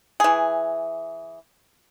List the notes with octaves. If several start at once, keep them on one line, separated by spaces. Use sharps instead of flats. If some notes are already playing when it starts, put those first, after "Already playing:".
E3 G#4